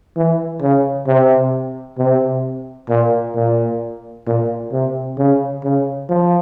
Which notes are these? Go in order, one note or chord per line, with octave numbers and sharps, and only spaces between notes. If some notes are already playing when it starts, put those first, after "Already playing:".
E3
C#3
C3
C3
A#2
A#2
A#2
C3
C#3
C#3
F3